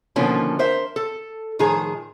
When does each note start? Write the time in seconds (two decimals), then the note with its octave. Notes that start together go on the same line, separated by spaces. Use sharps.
0.16 B2 D3 D#3 F3 A#3 C#4
0.59 A#4 C5 E5
0.96 A4
1.59 A2 D#3 F3 G#4 A#5